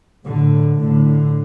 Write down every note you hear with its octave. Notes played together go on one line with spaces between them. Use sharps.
A2 D3
A2 D3